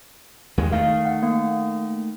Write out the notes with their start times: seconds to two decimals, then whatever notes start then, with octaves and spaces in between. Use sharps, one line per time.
0.58 D#2 G#3
0.72 D#3 A3 F5
1.06 F#5
1.23 A#3